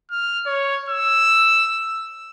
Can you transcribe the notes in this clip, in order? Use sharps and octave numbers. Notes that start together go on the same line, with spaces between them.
F6
C#5
E6